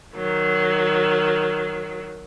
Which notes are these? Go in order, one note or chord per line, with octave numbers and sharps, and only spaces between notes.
D#3 F#3